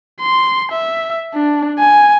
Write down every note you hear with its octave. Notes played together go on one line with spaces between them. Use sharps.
C6
E5
D4
G#5